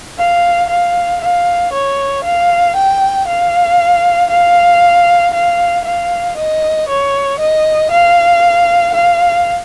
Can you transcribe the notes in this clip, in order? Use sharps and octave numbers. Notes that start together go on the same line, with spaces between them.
F5
F5
F5
C#5
F5
G5
F5
F5
F5
F5
D#5
C#5
D#5
F5
F5